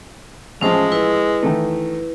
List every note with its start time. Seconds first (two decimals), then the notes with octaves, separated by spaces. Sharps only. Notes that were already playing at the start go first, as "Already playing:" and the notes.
0.61 A1 F3 G#3 C#4 C5 A5
0.92 E4 B4
1.43 D#3 E3 A3